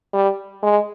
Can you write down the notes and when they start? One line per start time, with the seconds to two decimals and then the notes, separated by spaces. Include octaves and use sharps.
0.13 G3
0.63 G#3